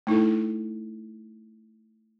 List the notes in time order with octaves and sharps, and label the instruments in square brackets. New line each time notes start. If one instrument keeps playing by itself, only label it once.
[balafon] A3 D#4 E4 A4